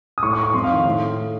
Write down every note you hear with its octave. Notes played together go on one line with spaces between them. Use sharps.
D#6
A2 C#6
C#6
C#6
F2 C6
F5
D#3
A2